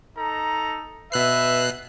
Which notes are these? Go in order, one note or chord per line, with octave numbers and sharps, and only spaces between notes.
D#4 A4 A#5
B2 B4 E5 F#6 C7